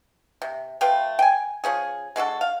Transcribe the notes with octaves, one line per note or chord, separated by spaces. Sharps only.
C3
F3 A3 B4 G5
G5 G#5
F3 C#4 G#4
G#3 D4 F#4 A4
F5